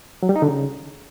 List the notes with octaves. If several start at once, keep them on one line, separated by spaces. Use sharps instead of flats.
F#3
G3
D#4
D3
C#3